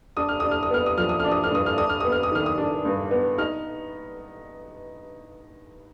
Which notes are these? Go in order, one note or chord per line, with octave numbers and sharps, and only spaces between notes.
D4 D#6
F6
D4 D#6
F6
D#6
B3 F6
D#6
F3 F6
D#6
D4 F6
D#6
F6
G2 D#6
F6
D4 D#6
F6
B3 D#6
F6
D#6
D#3 F6
D#6
D4
G2
B3
D#4 F6